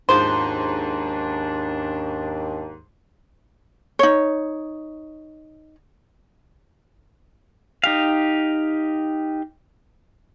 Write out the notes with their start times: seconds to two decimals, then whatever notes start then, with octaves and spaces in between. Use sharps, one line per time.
0.09 D#2 G#2 F3 C#4 D4 C5
3.99 D#4 C#5
7.84 D#4 G4 F5